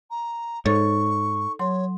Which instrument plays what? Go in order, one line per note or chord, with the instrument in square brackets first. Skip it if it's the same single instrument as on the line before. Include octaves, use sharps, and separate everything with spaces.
[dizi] A#5
[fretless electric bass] G#2 [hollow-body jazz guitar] D#4 C#5 [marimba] A4 [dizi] C#6
[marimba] F#3 C6 [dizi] C#5